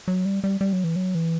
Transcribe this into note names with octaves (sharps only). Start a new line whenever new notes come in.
F#3
G3
G3
G3
F#3
E3
F#3
E3